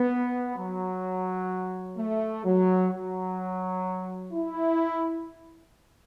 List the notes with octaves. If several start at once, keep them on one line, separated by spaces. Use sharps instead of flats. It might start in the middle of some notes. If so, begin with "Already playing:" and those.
Already playing: B3
F#3
A3
F#3
F#3
E4